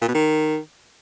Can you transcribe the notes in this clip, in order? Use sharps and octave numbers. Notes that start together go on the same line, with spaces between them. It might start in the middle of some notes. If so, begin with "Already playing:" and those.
A#2
B2
D#3